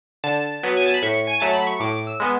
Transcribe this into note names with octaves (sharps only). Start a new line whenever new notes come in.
D3 A5
F#3 B3
G#5
A5
B5
A2 C#6
G#5
F#3 A3 A5
B5
C#6
A2 D6
E6
G#3 B3